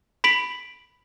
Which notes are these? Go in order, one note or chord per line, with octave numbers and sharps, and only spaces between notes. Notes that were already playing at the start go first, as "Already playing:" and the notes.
B5 B6 D7 F#7